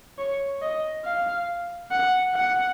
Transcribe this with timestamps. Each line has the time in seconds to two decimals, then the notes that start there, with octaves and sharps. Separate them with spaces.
0.18 C#5
0.62 D#5
1.05 F5
1.91 F#5
2.34 F#5